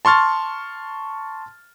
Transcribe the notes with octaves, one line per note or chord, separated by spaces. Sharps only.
A5 C6 C#6 F6 A6